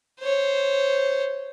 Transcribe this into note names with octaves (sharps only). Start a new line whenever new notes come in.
C5 C#5